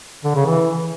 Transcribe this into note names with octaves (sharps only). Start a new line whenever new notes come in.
D3
C#3
E3